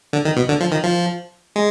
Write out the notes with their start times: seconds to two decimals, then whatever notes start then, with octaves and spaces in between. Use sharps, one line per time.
0.13 D3
0.25 D#3
0.37 B2
0.49 D3
0.61 F3
0.72 D#3
0.84 F3
1.56 G#3